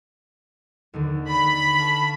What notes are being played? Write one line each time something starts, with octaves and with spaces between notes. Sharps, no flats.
D#2 D3 D#3
D5 B5
F5 A5 C#6